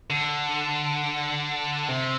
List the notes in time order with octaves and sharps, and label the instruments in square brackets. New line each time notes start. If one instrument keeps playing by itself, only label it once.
[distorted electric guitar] D3
C3